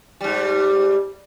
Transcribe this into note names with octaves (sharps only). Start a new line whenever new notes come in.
G#2 G3